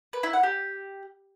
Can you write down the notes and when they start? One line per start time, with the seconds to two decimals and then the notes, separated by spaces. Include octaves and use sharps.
0.13 B4
0.23 E4
0.33 F#5
0.43 G4